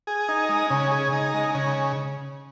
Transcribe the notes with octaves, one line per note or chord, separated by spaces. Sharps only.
G#4
D#4
G#3
C#3
G#4
D#4
G#3
C#3